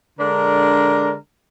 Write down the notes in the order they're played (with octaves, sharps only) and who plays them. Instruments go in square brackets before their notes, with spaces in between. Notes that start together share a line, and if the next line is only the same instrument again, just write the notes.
[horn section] D3 G#3 D4 A#4